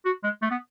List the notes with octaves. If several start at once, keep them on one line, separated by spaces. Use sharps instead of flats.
F#4
G#3
A3
B3